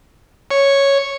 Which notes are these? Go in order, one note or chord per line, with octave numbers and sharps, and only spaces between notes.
C#5